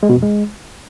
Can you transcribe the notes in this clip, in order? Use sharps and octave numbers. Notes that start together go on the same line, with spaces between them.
G#3
B2
F2
G#3